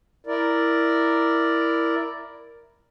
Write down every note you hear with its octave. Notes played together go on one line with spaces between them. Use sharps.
E4 A#4 D5